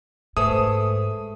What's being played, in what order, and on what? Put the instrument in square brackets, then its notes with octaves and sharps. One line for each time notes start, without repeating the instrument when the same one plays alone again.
[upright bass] G#2 [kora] A3 G#4 [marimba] B4 C5 [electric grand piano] D#6